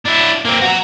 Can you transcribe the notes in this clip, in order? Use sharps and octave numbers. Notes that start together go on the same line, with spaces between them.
D4 E4
A#3 C4
F#4 A#5